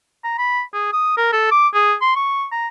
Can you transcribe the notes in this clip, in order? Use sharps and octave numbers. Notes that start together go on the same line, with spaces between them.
A#5
B5
G#4
D#6
A#4
A4
D6
G#4
C6
C#6
A#5